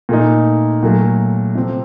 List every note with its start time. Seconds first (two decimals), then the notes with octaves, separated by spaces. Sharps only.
0.09 A#2 A3 D#4
0.83 A#2 F#3 A3
1.55 C3 F3 C4